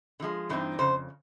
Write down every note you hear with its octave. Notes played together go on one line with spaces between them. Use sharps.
D3
F3 G#3
G2 E3 A3 C4 D#4
F2 C#3 C5